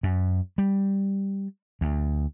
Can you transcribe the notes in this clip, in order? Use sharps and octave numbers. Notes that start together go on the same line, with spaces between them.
F#2
G3
D2